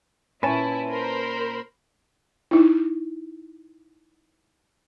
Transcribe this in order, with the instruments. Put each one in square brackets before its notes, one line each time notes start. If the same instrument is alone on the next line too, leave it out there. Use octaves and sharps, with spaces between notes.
[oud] A#2 C#4 [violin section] E4 [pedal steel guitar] B4 A5
[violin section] A#4 C5 B5
[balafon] D#4 E4